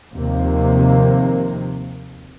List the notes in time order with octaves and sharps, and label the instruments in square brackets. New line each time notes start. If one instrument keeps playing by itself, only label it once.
[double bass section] D#2 C3 F3 A#3